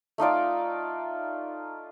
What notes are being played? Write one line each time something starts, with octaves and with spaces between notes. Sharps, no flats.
A3 D#4 F4 D5